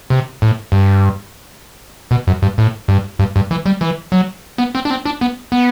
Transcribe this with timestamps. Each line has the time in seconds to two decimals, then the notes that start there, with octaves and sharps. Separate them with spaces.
0.10 C3
0.42 A2
0.72 G2
2.11 B2
2.27 F#2
2.42 G2
2.58 A2
2.88 G2
3.19 G2
3.36 G2
3.51 E3
3.66 G3
3.81 E3
4.12 F#3
4.58 B3
4.75 C4
4.85 D4
4.90 C4
5.05 D4
5.21 B3
5.52 B3